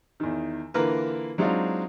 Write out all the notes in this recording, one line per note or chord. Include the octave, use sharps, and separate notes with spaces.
E2 D#3
D3 E3 A#3 F4 A#4 B4
F#3 G#3 C4 D4 D#4 F4